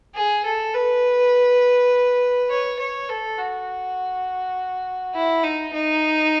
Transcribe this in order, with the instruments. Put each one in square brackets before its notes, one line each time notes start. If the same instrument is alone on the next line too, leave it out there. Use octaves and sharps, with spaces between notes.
[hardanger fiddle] G#4
A4
B4
C#5
C#5
A4
F#4
E4
D#4
D#4